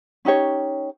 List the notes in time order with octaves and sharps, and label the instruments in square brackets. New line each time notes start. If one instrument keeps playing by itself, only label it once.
[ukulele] C#4 D#4 G4 C#5